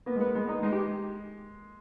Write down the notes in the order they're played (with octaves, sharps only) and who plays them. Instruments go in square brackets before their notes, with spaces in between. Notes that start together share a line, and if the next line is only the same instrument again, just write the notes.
[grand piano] A#3 [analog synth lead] B3
[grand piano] G#3
[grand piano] A#3 [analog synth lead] B3
[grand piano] G#3 [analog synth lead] B3
[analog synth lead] D#4
[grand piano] G#3 [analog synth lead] D#4
[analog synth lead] G4